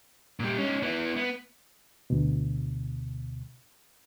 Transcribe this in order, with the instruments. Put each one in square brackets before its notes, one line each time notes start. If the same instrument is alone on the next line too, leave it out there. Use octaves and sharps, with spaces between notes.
[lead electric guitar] A#2 G3
C#4 D#4
B3 E4
B3
[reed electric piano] D2 B2